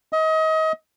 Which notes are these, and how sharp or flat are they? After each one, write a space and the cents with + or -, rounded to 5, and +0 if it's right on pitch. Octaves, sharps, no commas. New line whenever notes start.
D#5 +30